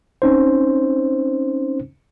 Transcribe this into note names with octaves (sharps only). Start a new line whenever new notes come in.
C4 C#4 D#4 C5